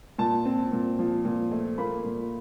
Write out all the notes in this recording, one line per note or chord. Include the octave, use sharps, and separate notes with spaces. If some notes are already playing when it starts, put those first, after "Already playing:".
A#2 A5
C4
A#2
F3
A#2
A3
A#3 B5
A#2